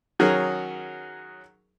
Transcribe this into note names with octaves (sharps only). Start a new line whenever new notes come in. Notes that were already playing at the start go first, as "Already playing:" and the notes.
D#3 F#3 C#4 G#4 A#4